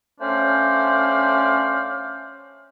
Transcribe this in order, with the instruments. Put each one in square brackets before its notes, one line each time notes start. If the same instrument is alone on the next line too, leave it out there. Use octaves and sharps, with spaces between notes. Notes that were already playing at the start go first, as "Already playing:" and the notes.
[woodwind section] A3 C#4 D4 C5 F5 G5